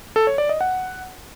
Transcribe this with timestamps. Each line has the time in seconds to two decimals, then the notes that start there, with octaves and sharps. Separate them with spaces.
0.16 A4
0.27 C#5
0.38 D5
0.49 D#5
0.61 F#5